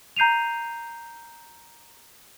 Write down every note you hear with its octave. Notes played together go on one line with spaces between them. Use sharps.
A#5 G6 C7 D#7 F7